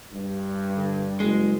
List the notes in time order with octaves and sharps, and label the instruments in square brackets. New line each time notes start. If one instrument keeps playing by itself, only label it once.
[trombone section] G2
[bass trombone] D3
[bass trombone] F#1 [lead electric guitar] G#3